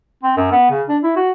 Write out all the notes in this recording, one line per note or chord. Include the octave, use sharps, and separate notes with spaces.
C4
F#2
B3
C#3
D4
E4
F#4